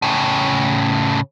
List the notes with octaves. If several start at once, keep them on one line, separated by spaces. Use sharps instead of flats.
A2 C#3